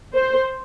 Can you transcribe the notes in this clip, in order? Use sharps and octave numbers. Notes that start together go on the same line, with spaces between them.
C5